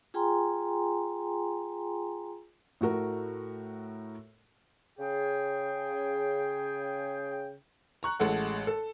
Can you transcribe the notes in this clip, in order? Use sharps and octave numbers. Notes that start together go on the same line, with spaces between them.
F4 G#4 G5 G#5 A#5 C6
A2 A3 F#4 A#4
C#3 G#4 G5
A#5 C#6 F#6
A1 G#3 A4 F#5
A4